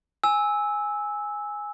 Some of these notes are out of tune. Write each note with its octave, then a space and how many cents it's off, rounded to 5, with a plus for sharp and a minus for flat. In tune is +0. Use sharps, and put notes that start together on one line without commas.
G#5 +0 E6 -15